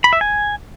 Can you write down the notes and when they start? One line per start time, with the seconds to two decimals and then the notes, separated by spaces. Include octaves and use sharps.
0.04 B5
0.13 E5
0.21 G#5